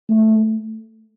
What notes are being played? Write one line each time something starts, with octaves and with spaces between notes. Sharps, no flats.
A3